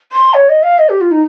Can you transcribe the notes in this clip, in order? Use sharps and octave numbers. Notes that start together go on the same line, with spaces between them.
C6
C#5
D#5
F5
D#5
G4
F4
D#4